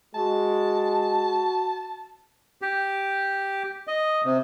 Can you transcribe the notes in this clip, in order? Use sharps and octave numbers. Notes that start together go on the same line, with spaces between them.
G#3 F#4 A5
G4
D#5
C3